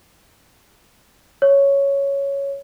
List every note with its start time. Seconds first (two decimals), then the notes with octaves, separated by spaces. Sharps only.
1.42 C#5